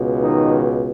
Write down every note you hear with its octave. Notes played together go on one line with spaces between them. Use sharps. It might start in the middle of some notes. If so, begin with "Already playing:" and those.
Already playing: C#2 B2
D#3 D#4